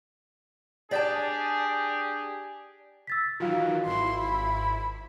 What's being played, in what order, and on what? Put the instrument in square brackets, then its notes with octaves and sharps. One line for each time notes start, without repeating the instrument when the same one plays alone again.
[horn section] D4 G4 G#4 [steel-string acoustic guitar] D5 G5 A5
[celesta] E6 A6 B6
[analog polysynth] D#3 E3 F#3 [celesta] F4 F#4 F5
[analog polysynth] G#1 E4 [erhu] C6
[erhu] B5